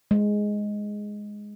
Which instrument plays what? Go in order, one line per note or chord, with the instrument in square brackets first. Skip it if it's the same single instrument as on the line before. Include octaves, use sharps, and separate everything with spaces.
[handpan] G#3